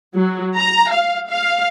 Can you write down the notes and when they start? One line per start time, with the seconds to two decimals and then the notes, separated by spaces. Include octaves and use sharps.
0.15 F#3
0.56 A#5
0.91 F5
1.30 F5